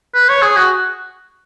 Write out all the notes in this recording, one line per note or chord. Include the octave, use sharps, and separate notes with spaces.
B4
C#5
G#4
F#4